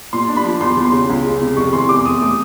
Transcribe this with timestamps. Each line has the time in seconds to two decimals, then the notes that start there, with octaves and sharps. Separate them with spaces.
0.13 A#2 C6
0.28 D4
0.37 B5
0.44 F3
0.61 E2 C6
0.77 E2
0.85 C6
0.92 C#3
1.09 C#2
1.25 G#3
1.41 C3
1.57 F1 C#6
1.73 E3 C6
1.89 E2 D6
2.05 E2 D#6
2.21 A3